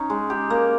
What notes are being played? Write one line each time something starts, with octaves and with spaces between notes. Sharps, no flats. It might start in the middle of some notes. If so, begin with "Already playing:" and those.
Already playing: C#4 D#4
G#3
G4
A#3